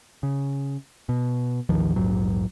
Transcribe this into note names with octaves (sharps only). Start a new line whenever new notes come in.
C#3
B2
A1 D#2 D#3 F3
A#1 E2 G#2 F#3